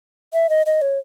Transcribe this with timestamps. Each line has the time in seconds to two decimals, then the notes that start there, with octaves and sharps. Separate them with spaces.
0.34 E5
0.50 D#5
0.66 D#5
0.82 C#5